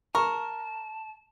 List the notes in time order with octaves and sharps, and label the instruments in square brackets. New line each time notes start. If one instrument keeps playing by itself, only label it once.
[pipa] A#4 [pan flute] A5 [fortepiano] C#6